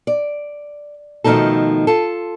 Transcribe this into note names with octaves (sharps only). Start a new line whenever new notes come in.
D5
B2 D#3 F3 A3 D#4 A4
F4 A4